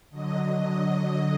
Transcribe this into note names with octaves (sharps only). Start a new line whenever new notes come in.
D3 F#3 D#5
D#5